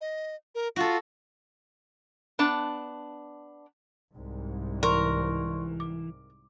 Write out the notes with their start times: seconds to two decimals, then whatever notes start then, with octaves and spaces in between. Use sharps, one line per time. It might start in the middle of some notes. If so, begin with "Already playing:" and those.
0.01 D#5
0.55 A#4
0.76 F4 F#4 A4
2.39 B3 D4 A5
4.13 C2 G#2
4.83 E3 A#4 D5 C6 C#6
5.80 D6